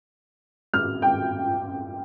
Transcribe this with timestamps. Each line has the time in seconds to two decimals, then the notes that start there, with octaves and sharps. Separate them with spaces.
0.74 F6
1.02 G5